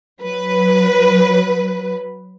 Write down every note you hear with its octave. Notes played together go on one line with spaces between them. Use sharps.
F#3 B4